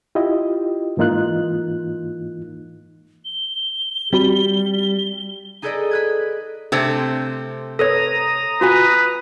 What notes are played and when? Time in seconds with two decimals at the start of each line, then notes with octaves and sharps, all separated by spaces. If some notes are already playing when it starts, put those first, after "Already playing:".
0.15 E4 F4 G4 D#5
0.97 G#2 E3 A#3 D#4 F4 F#6
3.25 G7
4.13 G3 C4 F#4 G4 B5
5.62 D#4 G#4 A4 B4 D5 D#5
5.91 B4 F#6 G#6
6.72 C3 A3 C4 D4 E6 G#6
7.79 A4 B4 C#5 A#5 D#6
8.61 F4 F#4 B4 G#5